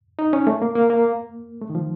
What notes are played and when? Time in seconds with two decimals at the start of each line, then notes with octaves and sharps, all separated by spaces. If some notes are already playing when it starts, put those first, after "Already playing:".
0.19 D#4
0.33 C#4
0.47 A3
0.62 A#3
0.75 A#3
0.90 A#3
1.61 A3
1.70 D#3
1.75 F3